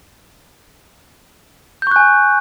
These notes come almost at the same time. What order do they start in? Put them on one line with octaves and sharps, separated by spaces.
G6 C#6 F#6 G#5